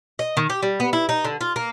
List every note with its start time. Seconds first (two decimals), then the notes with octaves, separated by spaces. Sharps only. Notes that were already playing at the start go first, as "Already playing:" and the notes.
0.19 D#5
0.37 D#3
0.50 G4
0.62 G3
0.80 B3
0.93 E4
1.09 D#4
1.25 D3
1.41 F4
1.56 A#3